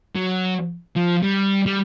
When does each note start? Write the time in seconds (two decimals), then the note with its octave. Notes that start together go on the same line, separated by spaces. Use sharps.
0.15 F#3
0.96 F3
1.23 G3
1.66 G3